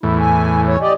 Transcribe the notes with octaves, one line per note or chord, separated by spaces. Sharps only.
E2 A2 E4
G#5
C#5
G4 D5 D#5